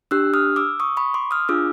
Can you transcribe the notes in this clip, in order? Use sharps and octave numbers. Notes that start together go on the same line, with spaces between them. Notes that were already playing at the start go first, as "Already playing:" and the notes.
D4 G4 E6 F#6
D#6 F6
D6 E6
C#6 D#6
B5 C#6
C6 D6
D#6 F6
D4 F4 G#4 D6 E6